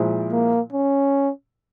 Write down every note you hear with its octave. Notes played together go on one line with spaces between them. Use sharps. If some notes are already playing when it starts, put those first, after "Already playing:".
Already playing: A#2 F3 G#3 E4
A#3
C#4